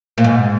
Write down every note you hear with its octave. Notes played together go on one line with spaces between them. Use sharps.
A#2
G#2